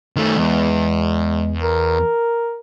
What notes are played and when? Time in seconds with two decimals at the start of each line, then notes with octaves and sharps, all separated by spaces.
0.16 D#3 A3
0.36 E2 G#3
1.63 A#4